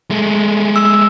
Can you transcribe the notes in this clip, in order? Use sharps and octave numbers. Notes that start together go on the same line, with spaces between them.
G#3 A3
E6